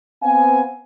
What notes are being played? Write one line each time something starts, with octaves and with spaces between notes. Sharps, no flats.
B3 C4 F5 G#5